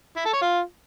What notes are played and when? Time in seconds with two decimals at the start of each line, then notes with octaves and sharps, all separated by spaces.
0.17 E4
0.25 A4
0.33 C#5
0.42 F4